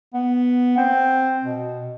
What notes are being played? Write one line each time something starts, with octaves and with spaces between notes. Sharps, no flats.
B3
C4
B2